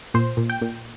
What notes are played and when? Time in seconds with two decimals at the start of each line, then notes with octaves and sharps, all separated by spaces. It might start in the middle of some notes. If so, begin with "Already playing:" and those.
0.14 A#2 C5
0.37 A#2
0.50 G5
0.62 A#2